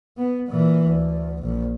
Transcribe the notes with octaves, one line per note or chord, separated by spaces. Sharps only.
B3
A#2 E3
D2
A#1